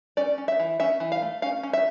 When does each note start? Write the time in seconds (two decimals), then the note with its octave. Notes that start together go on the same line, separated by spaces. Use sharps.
0.17 C#4 D5
0.38 C#4
0.48 E5
0.60 E3
0.80 C#4 E5
1.00 E3
1.12 F5
1.22 A3
1.42 C#4 F5
1.63 C#4
1.73 E5